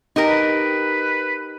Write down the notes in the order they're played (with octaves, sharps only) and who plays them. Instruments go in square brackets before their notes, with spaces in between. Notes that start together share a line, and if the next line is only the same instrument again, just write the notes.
[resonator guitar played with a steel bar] D#4 G4 A#4
[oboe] B4